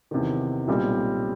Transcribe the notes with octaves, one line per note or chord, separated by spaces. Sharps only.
E2 C3 D#3
B1 A#2 G3 C4